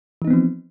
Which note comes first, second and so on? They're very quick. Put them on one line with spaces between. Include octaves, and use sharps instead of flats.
E3 D#4 B3 C4 F3